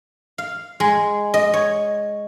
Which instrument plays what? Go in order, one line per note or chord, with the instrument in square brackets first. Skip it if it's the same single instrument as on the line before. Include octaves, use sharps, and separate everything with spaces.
[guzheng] F5
G#3
D#5
C#5